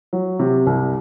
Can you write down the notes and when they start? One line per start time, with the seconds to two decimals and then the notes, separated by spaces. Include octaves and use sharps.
0.13 F#3
0.39 C3
0.67 C2